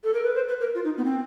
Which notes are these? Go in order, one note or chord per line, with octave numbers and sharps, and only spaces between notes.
A4
A#4
B4
C5
B4
A#4
F4
D#4
B3
C4